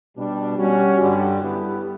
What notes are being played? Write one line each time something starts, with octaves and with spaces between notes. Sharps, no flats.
B2 G3 D4
G3 C#4 F#4
G2 D3 G3
G3 B3 E4 G4